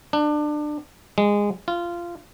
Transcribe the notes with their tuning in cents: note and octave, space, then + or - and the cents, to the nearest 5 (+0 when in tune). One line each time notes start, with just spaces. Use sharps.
D4 +25
G#3 -20
F4 -15